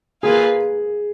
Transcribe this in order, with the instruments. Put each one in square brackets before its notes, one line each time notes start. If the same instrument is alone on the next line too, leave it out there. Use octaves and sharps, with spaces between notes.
[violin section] A#3 F4 B4 F5 G#5 [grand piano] G#4